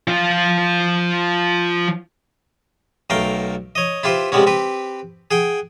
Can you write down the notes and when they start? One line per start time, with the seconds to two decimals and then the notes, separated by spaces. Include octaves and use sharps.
0.08 F3 F4
3.10 B1 A3 A#4 F5 G5
3.75 C#5 D#5
4.03 E4 F4 G4 B4 C5
4.32 C3 G3 G#3 B3 C#4
4.47 C4 G4 B4
5.31 G#4 F#5 G5